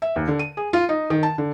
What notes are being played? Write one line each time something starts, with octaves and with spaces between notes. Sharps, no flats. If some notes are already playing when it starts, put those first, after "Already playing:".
E5
D#2
D3
D#7
G#4
F4
D#4
D#3
A5
D3